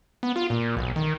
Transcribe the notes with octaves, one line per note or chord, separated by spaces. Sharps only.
B3
F4
A#2
B1
D#3